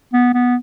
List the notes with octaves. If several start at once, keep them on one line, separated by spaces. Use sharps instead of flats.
B3
B3